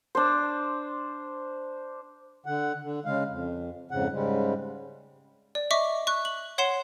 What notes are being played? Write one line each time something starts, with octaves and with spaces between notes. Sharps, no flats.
D4 C5
D3 F#5
D3
C#3 G#3 F5
F2
F2 G#2 C#3 F#5
G#2 C#3 G3 G#3
D5
D#5 E5 C#6 D6 B6
C#6 F#6
F#7
C#5 F#5 C6 C7 E7